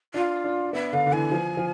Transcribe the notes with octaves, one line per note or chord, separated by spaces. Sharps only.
D4 F4
D4
B3 E5
D3 F5
D3
E3 G#5
F3
F3